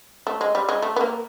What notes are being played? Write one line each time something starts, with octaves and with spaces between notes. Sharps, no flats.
A3
G#3
G3
G#3
A3
B3
A#3